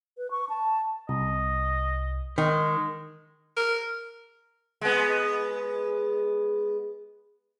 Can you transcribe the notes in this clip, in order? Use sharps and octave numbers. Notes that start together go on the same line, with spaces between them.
B4
C#6
A5
C2 D#5
D#3 G#3
A#4
G#3 B3